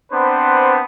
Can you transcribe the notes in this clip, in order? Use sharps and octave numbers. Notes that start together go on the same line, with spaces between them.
B3 C4 D4 B4 C5